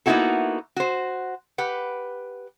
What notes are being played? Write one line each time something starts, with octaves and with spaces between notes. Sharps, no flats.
A#3 B3 D#4 E4 F#4 A4
F#4 C5
G4 B4 F#5